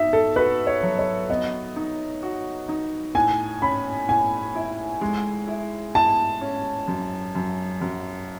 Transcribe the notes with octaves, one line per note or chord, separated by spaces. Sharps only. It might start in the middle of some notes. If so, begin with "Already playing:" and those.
Already playing: D#4 F#4 E5
A4
F#4 B4
C#5
F#3
C#5
B3 D#5
D#4
F#4
D#4
A2 G#5
C#4 B5
A2 G#5
E4
G#3
E4
E4 A5
C#4
F#2
F#2
F#2